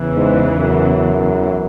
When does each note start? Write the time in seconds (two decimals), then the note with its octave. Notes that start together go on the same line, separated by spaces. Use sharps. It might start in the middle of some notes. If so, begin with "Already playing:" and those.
Already playing: E2 C#3 E3
0.15 G#2
0.59 F#2